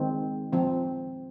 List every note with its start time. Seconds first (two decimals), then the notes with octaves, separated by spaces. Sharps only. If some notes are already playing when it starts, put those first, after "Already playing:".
Already playing: D#3 G#3 C4
0.53 F3 C4